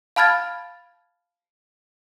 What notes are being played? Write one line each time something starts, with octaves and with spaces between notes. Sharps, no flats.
F5 A5 B5 F6 G#6 A6